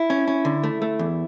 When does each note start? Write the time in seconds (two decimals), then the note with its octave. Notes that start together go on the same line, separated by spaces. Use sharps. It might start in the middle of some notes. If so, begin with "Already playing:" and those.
Already playing: E4
0.10 C#4
0.28 C#4
0.45 D3
0.63 A3
0.82 A3
0.99 E2